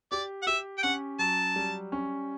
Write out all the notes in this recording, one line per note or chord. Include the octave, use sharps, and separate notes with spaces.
G4 D5
F#5
G4 E5
G5
C#4 F#5
F#3 A5
G3
C#4